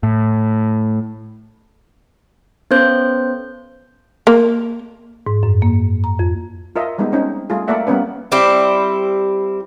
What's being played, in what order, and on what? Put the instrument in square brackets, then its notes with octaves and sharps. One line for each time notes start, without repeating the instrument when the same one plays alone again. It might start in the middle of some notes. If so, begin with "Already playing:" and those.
[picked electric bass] A2
[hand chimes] B3 C#4 A4 C5 G6
[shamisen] A#3
[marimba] G#2
F#2
A#3
A#5
F2
[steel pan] F4 A#4 D#5 E5
G3 G#3 B3 D#4
C4 C#4 D#4
G3 A3 F4 G#4
A3 A#3 A4 D5 E5 F#5
G3 A#3 B3 C#4 B4
[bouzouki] G3 C4 E4 G4